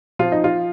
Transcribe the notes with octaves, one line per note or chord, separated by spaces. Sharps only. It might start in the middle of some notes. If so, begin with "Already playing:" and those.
F3 F4
D#4
F4